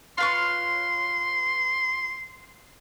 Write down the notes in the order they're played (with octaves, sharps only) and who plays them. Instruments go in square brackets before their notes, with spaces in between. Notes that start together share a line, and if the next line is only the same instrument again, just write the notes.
[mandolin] F4 B4 C#5 [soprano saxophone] C6